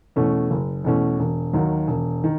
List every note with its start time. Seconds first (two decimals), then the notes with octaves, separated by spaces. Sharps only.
0.16 E2 B2 A3 C#4
0.50 F#1
0.84 E2 B2 A3 C#4
1.19 E1
1.53 D#2 D#3 F#3
1.87 E1
2.24 D#3